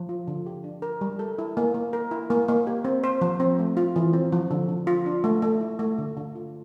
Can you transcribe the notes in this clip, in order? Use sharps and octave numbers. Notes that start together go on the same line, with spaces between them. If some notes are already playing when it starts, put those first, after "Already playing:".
Already playing: F3
F4
D3
G4
D4
A#4
G3
A4
E4
A#3
A#3
A#4
E4
A#3
A#3
G4
C4
C5
F3
C4
A3
F4
E3
C4
F3
D3
D3
F4
D4
A3
A3
E4
A3
D3
D3
F4